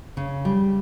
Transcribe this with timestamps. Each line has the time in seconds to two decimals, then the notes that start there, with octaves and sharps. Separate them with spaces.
0.17 C#3
0.45 G3